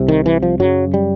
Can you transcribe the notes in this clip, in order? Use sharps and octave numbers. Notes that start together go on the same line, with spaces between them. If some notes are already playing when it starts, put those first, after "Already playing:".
Already playing: C2 C3
D#3
E3
F3
F#2 C#3 F#3
G3